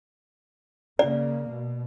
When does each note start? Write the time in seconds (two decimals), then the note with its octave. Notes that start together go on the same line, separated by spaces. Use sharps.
0.99 C#3 A#3 D5
1.49 B2